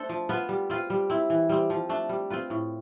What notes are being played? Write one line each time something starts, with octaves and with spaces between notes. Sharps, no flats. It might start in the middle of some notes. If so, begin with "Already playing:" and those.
Already playing: A3 D4 A4 C5
F3
B3 F4 B4
G3
C4 F4 B4
G3
C4 E4
E3
G3 C4
F3
A3 D4
G3
C4 F4 B4
A2